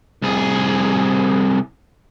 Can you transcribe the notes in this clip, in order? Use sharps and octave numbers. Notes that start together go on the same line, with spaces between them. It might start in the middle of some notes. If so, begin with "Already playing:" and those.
C2 G#4